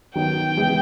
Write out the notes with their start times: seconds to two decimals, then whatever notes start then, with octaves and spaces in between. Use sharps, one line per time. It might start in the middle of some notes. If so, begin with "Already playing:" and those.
0.15 D#3 F#3 B3 D#4 G5
0.56 C#3 E3 G#3 B3 E4